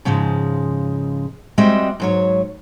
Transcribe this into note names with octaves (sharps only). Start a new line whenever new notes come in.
G#2 C#3 F3 G#3
G3 G#3 C4 F#4 D#5 E5
G#2 F#3 C#5